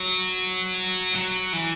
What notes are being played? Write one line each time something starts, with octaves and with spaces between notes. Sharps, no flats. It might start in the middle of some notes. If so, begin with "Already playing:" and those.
Already playing: F#3
F#3
E3